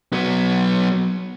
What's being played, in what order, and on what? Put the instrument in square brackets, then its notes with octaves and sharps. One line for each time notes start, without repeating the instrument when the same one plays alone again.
[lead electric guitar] F#3 B3